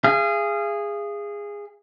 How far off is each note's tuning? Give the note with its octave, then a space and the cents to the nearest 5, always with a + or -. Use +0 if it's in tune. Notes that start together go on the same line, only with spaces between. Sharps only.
G#4 -15 F5 -35